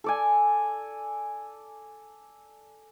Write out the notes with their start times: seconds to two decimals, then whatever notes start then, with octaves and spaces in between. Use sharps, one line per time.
0.04 A4 D5 G#5